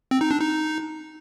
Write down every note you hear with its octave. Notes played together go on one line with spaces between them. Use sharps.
C4
D#4
D4
D#4